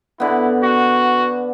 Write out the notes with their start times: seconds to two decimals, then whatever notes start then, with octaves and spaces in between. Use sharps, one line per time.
0.20 D3 B3 E4
0.63 F#4